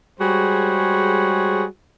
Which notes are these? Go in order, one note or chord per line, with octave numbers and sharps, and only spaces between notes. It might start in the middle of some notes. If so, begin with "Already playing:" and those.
G3 G#3 F#4 G#4 C5 C#5